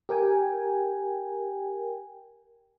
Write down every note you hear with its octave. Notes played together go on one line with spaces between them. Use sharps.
G4 A#4 G5 G#5